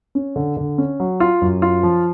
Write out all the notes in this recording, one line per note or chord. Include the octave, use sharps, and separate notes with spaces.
C#4
D3
D3
C#4
F#3
F4
F#2
F4
F3